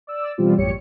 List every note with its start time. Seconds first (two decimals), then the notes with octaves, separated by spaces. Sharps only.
0.07 D5 E6
0.38 B2 E3 G3 C4 F4
0.57 A1 F#2 G4 C#5 C#7